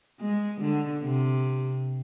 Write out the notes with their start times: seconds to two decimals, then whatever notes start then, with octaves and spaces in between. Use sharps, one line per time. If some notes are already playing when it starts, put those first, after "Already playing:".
0.20 G#3
0.61 D3
1.02 C3